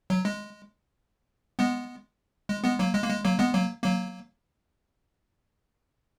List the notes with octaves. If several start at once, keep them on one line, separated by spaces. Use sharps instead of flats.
F#3
G#3
G#3 B3
G#3
G#3 B3
F#3 A#3
G#3
A#3
G#3
F#3 A#3
G#3 B3
F#3 A#3
F#3 A#3